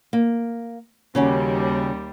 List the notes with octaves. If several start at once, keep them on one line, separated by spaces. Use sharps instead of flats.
A#3
D#2 C#3 G3 C#4 F#4